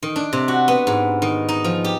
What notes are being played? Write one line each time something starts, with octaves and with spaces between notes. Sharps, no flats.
D#3
D4
C3
F#4
B3
G#2
D#3
D#4
F3
G4